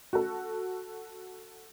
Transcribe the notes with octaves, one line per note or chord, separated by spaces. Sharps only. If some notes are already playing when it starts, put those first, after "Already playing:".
F#4 A4